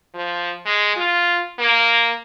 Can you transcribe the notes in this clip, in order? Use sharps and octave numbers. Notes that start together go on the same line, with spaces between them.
F3
G#3
F4
A#3